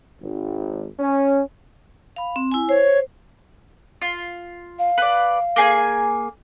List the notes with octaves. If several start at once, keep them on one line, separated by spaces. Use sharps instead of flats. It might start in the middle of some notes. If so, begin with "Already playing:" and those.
G#1
C#4
F5 B5
C4
E4 G#5
C5 C#5
F4
F5
B4 D5
A#3 G#4 G#5